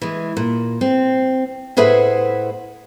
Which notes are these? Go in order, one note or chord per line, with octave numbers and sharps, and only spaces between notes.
E3 G#3
A#2
C4
A2 G#4 B4 C5 E5 F#5